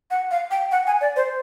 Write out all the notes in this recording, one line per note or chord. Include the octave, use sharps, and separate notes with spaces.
F#5
F5
G5
F#5
G#5
D5
C5